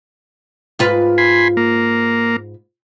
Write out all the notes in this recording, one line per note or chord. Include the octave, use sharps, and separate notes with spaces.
G#2 F4 B4
G#5 B5 C6
A#3